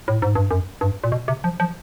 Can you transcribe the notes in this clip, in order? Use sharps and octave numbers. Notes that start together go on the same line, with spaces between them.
A2
G#2
G2
F#2
G2
A#2
B2
C3
F3
F3